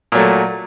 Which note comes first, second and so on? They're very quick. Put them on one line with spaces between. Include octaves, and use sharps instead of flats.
A#2 F#3 A3